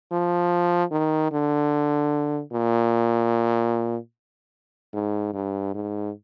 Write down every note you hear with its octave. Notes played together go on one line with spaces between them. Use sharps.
F3
D#3
D3
A#2
G#2
G2
G#2